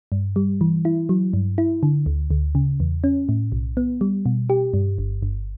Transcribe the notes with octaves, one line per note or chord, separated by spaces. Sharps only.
G2
G3
E3
E4
F#3
G2
E4
D3
D2
D2
C#3
E2
C#4
A2
B1
B3
G3
B2
G4
G2
G1
G1